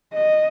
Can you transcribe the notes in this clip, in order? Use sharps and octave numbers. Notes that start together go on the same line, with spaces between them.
D#5